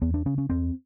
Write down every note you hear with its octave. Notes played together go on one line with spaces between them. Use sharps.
E2 B3
D4
C#3 C#4
C#4
E2 C4